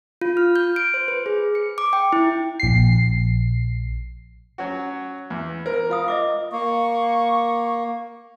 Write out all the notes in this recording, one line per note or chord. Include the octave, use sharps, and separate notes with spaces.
F4
F6
G6
D7
C5
B4
G#4
C#7
D6
G5
E4
A#1 C7
F#3 C#4 F#4
E2
A#4 C5
F4 F5 D#6
D#5 E5 D6
A#3 C#6